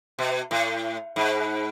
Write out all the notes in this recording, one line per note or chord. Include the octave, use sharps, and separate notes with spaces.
B2
A2
G#2